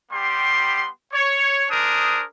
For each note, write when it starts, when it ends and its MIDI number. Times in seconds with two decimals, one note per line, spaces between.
0.11 0.88 55
0.11 0.88 59
0.11 0.88 67
0.11 0.88 84
1.13 1.64 73
1.70 2.23 62
1.70 2.23 68
1.70 2.23 70
1.70 2.23 72
1.70 2.23 87